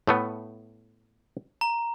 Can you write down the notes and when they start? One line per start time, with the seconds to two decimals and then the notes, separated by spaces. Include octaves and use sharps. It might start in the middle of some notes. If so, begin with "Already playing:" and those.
0.07 A2 A3 B3
1.61 A#5